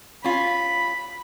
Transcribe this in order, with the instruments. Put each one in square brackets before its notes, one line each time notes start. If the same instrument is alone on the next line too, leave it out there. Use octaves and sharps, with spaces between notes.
[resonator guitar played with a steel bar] C#4 F4 [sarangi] B5